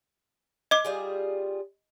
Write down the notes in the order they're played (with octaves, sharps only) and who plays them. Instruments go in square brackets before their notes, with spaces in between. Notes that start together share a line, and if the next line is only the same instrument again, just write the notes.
[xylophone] D#5 D6
[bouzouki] G3 F4 G#4